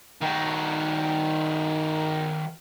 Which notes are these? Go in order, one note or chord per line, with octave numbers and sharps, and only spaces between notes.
D#3 F#4